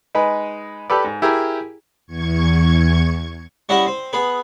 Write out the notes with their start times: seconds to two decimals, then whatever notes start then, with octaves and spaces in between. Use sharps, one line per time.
0.15 G#3 D#4 B4
0.90 G4 A4 B4 D5
1.04 G#2
1.22 E4 G4 G#4 A#4
2.06 E2 C#6 G#6
3.69 G3 C#4 E4 D#5 E5 F#5
3.87 C4
4.13 B3 G#4 B4